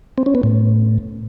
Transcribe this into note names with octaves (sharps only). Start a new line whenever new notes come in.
C4
C#4
B3
A2